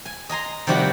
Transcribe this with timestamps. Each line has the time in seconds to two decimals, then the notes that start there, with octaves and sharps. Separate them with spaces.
0.05 G#5
0.29 D#5 G#5 A#5 C6
0.67 C3 D#3 F3 G3 F#4 G4